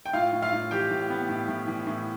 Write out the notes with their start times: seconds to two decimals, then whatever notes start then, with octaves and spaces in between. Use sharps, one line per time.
0.06 G5
0.13 A2 F4 F5
0.32 A2
0.42 F4 F5
0.53 A2
0.71 E3 G4 G5
0.91 A2
1.10 B3
1.29 A2
1.48 A2
1.67 E3
1.87 A2